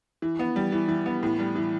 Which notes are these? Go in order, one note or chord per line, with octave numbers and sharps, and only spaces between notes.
E3
B3
G3
E3
E3
B3
A2
G3
E3